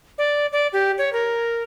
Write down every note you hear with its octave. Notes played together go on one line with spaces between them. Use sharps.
D5
D5
G4
C#5
A#4